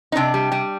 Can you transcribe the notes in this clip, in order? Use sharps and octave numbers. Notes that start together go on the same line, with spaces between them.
D#4
C3 D4
G3
G3